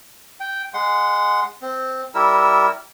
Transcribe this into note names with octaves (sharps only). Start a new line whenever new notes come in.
G5
G#3 F#5 C6
C4
G3 E4 A#4 E6